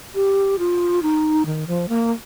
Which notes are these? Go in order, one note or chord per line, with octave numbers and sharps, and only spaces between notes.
G4
F4
D#4
D#3
F3
A#3